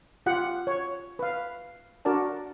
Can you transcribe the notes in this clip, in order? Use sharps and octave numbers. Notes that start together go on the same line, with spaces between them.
F4 G4 F#5
C#5
B4 F5
D4 F#4 A#4 D5 A5